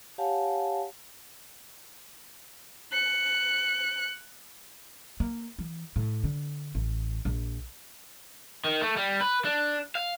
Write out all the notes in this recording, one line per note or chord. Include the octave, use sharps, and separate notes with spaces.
G4 C#5 F5 F#5 G#5 A5
F#6 C#7
A#3
E3
A2
D3
A1
A#1
D#3
A3
G3
B4
D4
F5